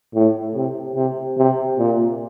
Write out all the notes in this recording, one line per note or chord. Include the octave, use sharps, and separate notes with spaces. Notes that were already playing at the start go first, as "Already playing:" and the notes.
A2
C3
C3
C3
A#2